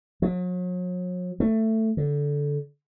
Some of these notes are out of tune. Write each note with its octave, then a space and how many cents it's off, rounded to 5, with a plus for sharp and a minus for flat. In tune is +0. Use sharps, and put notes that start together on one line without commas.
F#3 -40
A3 +10
D3 -15